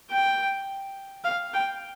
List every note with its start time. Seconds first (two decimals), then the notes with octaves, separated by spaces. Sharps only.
0.11 G5
1.24 F5
1.53 G5